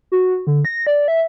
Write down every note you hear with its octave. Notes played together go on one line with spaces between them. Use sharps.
F#4
D3
A#6
D5
E5